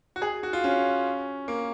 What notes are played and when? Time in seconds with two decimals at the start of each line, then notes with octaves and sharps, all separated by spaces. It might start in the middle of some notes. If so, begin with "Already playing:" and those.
0.16 F#4
0.22 G#4
0.43 F#4
0.53 F4
0.64 C#4
1.48 A#3